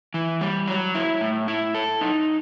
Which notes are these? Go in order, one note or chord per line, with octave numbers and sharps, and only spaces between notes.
E3
G3
F#3
E4
A2
E4
A4
D#4